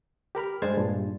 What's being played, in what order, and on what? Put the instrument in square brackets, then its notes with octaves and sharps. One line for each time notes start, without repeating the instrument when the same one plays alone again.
[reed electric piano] G4 A#4 B5 F6
G2 G#3 C5 G#6 A6
G2 A#2